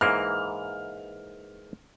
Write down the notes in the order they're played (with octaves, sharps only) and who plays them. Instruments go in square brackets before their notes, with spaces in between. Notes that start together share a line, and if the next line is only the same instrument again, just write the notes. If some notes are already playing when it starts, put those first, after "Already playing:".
[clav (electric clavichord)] G#2 E3 A#3 [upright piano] F6